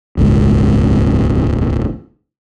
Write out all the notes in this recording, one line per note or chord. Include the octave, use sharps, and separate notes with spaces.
D#1 G#1 C#2 G#3